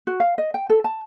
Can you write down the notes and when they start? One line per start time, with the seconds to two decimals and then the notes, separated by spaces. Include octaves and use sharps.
0.07 F#4
0.20 F5
0.38 D#5
0.54 G5
0.70 A4
0.84 A5